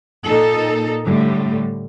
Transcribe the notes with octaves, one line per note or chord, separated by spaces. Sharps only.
A#2 D#4 A4
A2 D3 G3